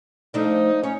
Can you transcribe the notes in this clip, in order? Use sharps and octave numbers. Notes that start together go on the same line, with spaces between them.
F3 A3 D4 D#4
C#4 C#5